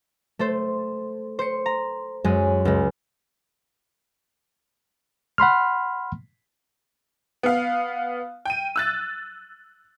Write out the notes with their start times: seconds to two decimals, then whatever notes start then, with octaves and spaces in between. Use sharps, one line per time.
0.39 A3 A4 C5
1.39 C5 C#7
1.66 A#5
2.24 F#2 G#3 G#4
2.65 C#2 G#3
5.38 F#5 B5 C6 F6
7.43 B3 F5
8.45 G5 D#7
8.76 E6 F#6 A6